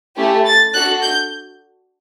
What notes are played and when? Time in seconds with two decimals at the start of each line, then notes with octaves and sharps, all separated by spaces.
0.16 A3 C#4 E4 G4
0.45 A6
0.73 D4 F#4 A4 F#6
1.02 G6